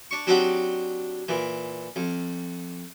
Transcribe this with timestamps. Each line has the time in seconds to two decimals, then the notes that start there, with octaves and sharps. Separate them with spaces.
0.11 D4 C#6
0.27 F#3 C4 D4 D#4 F#4 G4
1.28 A#2 E3
1.96 F2